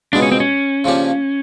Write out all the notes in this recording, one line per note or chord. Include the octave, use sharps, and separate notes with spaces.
C#2 B2 G#3 B3 D4 D#4
C#4
C4
C#4
C#3 F3 A#3 D4 G4